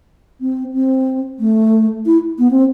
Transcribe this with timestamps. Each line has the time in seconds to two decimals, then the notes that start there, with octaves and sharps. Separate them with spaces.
0.41 C4
0.74 C4
1.40 A3
2.06 E4
2.39 B3
2.51 C4